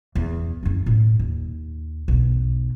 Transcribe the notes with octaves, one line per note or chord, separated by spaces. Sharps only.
E2
F#2 E4
A2
D#2
B1 E2